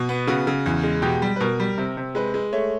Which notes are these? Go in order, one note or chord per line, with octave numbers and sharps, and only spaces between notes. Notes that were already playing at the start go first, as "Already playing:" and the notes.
Already playing: B2
B3
C#3 F#4
C#3
E2
G#3
B2 G4
G3
B4
B2 A#4
G3
C3
C3
G#3 B4
G#3
A3 C#5